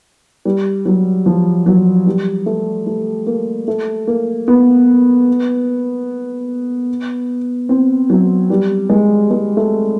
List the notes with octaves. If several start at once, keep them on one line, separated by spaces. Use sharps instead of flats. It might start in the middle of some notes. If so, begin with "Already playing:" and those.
G3
F#3
F3
F#3
G3
A3
A3
A#3
A3
A#3
B3
C4
F#3
G3
G#3
G#3
A3